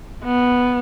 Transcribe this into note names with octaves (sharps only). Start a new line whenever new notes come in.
B3